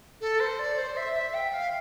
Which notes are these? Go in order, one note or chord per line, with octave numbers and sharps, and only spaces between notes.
A4
C5
D5
C5
E5
E5
G5
F5